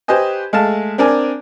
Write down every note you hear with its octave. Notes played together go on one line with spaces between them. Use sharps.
G4 B4 C5 D#5 G#5
G#3 A3 F5 A5
C4 D4 A#4 D5 G#5